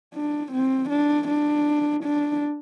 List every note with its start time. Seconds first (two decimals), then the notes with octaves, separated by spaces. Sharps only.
0.15 D4
0.52 C4
0.90 D4
1.28 D4
2.04 D4